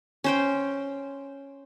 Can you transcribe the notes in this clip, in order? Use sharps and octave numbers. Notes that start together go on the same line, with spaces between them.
C#4 C5 G5